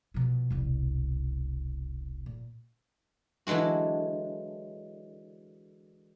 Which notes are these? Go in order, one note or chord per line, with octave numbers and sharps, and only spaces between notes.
B2 F3
E1 C2
A#2
D3 E3 F#3 G#3 F#4